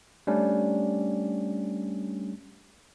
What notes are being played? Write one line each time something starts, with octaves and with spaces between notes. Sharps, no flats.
G3 A3 C#4 D4